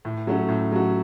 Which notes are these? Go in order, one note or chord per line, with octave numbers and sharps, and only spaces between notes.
A2
F#3 A3 C#4 F#4
A2
F#3 A3 C#4 F#4